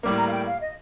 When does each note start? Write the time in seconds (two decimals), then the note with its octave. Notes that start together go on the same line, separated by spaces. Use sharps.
0.03 A2 G3 A#3 D6
0.17 A#5
0.27 F5
0.32 G5
0.47 F5
0.60 D#5